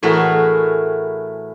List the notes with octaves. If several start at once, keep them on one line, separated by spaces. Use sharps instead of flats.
A2 E3 A3 F#4 G#4 A#4